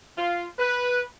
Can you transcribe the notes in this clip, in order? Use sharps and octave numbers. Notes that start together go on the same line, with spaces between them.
F4
B4